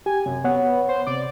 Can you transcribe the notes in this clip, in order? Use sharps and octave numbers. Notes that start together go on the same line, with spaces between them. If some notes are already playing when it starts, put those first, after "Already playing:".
G4 G#5
F#2 C3
B3 C#5 F#5
C5
C3 D5